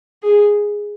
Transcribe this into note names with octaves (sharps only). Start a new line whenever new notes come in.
G#4